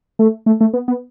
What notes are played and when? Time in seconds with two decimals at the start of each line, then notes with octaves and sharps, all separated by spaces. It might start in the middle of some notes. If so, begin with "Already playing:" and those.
0.19 A3
0.46 A3
0.61 A3
0.74 B3
0.88 B3